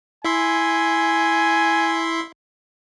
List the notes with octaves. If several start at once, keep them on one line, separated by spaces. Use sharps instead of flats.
E4 E5 G#5 C6